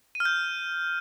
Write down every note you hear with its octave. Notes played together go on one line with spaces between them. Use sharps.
D#7
F6
G6